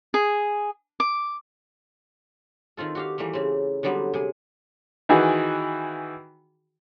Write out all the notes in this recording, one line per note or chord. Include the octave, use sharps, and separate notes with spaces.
G#4
D6
D#3 C4 F4 A4
F#4 G4 F5
E3 G3 A3 A#3
C#3 C4
D3 F#3 G3 B3 C4
C3 G#4
D#3 E3 F#4 G#4